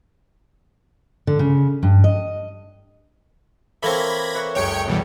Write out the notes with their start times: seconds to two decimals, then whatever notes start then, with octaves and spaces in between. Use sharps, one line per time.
1.27 D3
1.39 C#3
1.83 G2
2.04 D#5
3.83 E3 A#3 C4 A4 C#5 B5 G#6 A#6
4.35 B4 C#5 E5
4.55 F#1 C#2 F#2 C#5 G5 C#7
4.88 B2 E3 G3